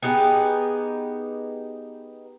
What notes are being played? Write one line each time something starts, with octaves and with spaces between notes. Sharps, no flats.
B3 D#4 G4 G#4